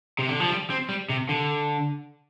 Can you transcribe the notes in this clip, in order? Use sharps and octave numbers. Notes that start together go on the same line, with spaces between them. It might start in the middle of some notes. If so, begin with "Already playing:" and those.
C3
D3
F3
G3
C4
G3
C3
D3